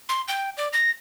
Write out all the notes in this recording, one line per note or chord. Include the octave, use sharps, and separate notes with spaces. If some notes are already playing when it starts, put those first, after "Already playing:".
C6
G5
D5
A#6